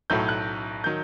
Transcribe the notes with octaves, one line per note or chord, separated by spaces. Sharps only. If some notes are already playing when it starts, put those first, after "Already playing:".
B1 A2 F#3 A3 G6
F#6
D#3 F#3 G6